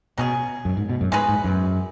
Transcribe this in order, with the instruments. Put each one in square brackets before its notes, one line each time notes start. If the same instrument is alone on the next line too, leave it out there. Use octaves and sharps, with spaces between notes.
[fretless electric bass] B2 [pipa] F#3 C#4 G#4
[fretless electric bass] F#2
G#2
B2
F#2
[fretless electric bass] G#2 [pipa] G#3 C#4 G#4 B4
[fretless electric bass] G#2
F#2